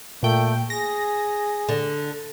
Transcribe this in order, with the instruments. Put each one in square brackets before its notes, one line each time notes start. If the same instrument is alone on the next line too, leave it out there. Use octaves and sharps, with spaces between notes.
[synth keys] A#2 G5 [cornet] A3
[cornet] G#4 [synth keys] A#6
[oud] D3